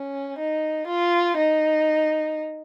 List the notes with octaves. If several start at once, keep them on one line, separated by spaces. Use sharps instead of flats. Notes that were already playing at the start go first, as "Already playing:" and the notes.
Already playing: C#4
D#4
F4
D#4